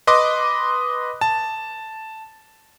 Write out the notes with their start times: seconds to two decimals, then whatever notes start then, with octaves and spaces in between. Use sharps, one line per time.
0.07 B4 D#5 C6 D6
1.21 A5